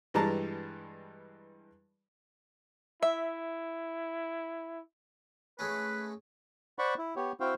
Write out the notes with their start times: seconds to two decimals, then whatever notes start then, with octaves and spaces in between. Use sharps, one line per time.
0.14 G2 E3 G3 G#3 A5 A#5
3.03 E4 E5
5.59 G#3 A3 C#4 B4
6.79 C5 D5 F#5 B5 C#6
6.98 E4
7.16 B3 G4 C#5
7.40 C4 E4 F#4 C5 F5 G5